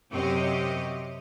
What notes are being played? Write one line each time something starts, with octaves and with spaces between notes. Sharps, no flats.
F#2 C3 C4 G4 C#5 D#5